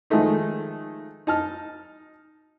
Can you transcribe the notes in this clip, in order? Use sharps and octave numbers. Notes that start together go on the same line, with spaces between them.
D#3 F3 G#3 A3 D#4
D#4 A5 F6